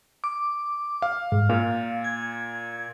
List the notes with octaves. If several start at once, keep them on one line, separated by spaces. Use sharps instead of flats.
D6
F5
G#2
A#2 F5
G#6